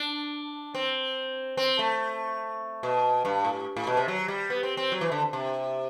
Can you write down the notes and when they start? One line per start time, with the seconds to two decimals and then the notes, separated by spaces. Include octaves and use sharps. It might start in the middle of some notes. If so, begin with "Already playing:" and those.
Already playing: D4
0.75 C4
1.57 C4
1.79 A3
2.83 B2
3.25 G2
3.45 A2
3.77 A2
3.87 B2
3.97 C3
4.08 F#3
4.28 G3
4.50 B3
4.63 C4
4.77 C4
4.92 F#3
5.01 E3
5.12 D3
5.33 C3